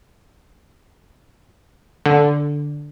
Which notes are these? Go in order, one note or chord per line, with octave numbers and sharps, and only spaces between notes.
D3